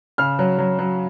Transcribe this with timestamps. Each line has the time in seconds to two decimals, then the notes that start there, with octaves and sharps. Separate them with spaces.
0.18 C#3 F6
0.39 F#3
0.59 F#3
0.79 F#3